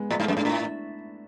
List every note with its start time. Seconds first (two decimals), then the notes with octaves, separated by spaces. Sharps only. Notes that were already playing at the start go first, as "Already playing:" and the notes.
Already playing: G#3 B3
0.10 A2 G#3
0.20 G#2 A3
0.28 F#2
0.36 G#2 D4
0.45 A2 E4